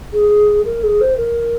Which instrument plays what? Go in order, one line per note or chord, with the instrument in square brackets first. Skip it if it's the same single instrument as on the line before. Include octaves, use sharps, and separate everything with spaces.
[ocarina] G#4
A#4
G#4
C5
A#4